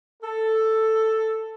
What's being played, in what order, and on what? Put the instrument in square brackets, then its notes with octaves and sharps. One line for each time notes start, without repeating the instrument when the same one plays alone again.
[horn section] A4